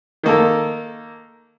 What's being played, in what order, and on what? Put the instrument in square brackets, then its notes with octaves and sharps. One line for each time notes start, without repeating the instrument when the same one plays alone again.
[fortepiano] D#3 A#3 A4